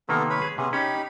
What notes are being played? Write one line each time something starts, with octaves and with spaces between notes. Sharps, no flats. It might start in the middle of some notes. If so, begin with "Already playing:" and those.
C3 D#3 A#3 B3 A4
B4 C#5 B5
G#4
C3 B3 C#4 G#4
C#4 D#4 G4 B5